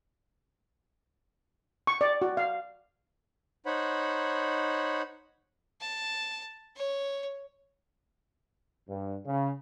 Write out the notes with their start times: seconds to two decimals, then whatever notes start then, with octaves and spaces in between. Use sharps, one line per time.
1.87 C#6
2.01 D5
2.22 F#4
2.37 F5
3.66 D#4 C5 C#5 F#5 B5
5.81 A5
6.76 C#5
8.88 G2
9.26 C#3